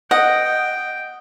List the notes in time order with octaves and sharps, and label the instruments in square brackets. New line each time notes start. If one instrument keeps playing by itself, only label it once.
[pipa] D#5 [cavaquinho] F#5 [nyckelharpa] G5